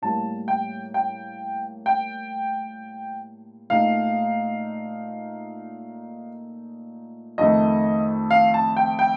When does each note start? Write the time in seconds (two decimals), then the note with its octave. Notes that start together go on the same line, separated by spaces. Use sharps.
0.02 A2 G3 A#3 A5
0.48 G5
0.94 G5
1.86 G5
3.70 A#2 A3 D#4 F5
7.38 F2 D#3 A3 D#5
8.31 F5
8.54 A5
8.77 G5
8.99 G5